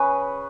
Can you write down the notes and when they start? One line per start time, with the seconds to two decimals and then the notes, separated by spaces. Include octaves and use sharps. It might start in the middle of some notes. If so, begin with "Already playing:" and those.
Already playing: C#3 B4